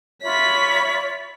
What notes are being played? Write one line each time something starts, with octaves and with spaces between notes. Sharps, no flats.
F4 C#5 E5 B5 B6